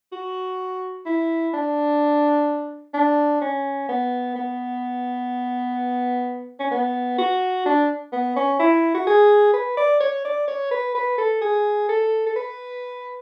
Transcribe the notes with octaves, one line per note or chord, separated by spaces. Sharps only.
F#4
E4
D4
D4
C#4
B3
B3
C#4
B3
F#4
D4
B3
C#4
E4
F#4
G#4
B4
D5
C#5
D5
C#5
B4
B4
A4
G#4
A4
A4
B4